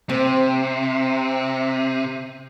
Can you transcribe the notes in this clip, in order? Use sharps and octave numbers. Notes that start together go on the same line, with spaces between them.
C3 C4